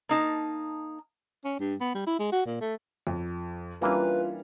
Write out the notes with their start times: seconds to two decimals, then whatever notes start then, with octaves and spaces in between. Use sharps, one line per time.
0.09 A#3 D#4 A5
1.45 C#4
1.59 G2
1.81 B3
1.94 G3
2.07 E4
2.19 G#3
2.32 F#4
2.46 A#2
2.61 A3
3.07 F2
3.82 E3 G3 A#3 C#4 D4 F4 B4